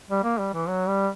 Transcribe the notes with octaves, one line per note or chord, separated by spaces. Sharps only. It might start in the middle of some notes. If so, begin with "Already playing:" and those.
G3
A#3
G3
E3
F#3
G3